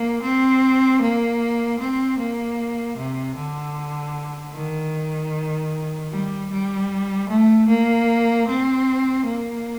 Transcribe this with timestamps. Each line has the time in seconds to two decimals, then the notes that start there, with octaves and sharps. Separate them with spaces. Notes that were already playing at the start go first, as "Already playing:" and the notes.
Already playing: A#3
0.22 C4
1.01 A#3
1.79 C4
2.18 A#3
2.97 C3
3.36 D3
4.54 D#3
6.11 G3
6.50 G3
7.29 A3
7.68 A#3
8.47 C4
9.25 A#3